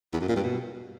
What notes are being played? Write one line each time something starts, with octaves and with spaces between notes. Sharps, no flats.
E2
F#2
A#2
G2
B2